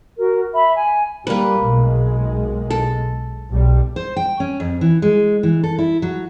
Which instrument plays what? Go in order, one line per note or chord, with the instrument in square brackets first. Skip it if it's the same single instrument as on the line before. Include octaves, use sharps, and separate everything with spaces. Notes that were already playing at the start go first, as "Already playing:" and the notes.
[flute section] F#4 A#4
E5 B5
G#5
[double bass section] G3 [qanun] A#3 B4
[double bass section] B1 G#3
[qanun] A4
[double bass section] B1 G3
[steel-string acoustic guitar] C5
G5
C#4
F2
E3
G#3
E3
A4
E4
F#3